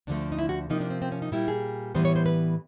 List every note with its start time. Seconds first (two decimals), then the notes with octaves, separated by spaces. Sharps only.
0.07 D2 D3 F3 A3 D4
0.32 D#4
0.39 E4
0.49 F#4
0.70 C3 F3 A#3 D#4
0.80 D4
0.90 C4
1.02 C4
1.12 C#4
1.22 D#4
1.32 A#2 G3 A#3 E4
1.48 G#4
1.95 A2 E3 G3 B3 C5
2.05 C#5
2.16 C5
2.26 B4